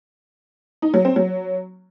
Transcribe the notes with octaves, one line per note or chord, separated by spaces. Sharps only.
D#4
F#3
C4
F#3